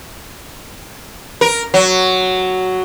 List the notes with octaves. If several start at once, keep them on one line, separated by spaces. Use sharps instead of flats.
A#4
F#3